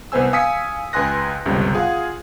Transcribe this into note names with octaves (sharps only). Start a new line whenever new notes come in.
C2 B3 B4 C5 G#5 E6
F5 G#5 D#6 E6 B6 C#7
C#2 B4 G#5 C6 F#6 A#6
G1 C#2 C3 G3
F4 G#4 F5 F#5